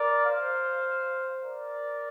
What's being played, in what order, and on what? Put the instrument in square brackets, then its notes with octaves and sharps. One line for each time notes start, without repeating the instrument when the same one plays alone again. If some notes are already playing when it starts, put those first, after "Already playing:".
Already playing: [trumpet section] A#4 D5
C5 F5
A#4 D5